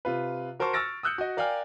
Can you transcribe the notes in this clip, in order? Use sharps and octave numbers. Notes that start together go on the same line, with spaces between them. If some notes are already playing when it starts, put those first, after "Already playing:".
C3 F4 B4
F#4 A#4 C5 A5 C6 C#6
C#6 E6 F6 A6 A#6 D7
D#6 E6 F#6 G6 C#7
F#4 D#5
A#4 D5 F5 G5 G#5 F6